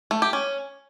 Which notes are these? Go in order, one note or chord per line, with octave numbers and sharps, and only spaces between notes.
A3
G4
C#4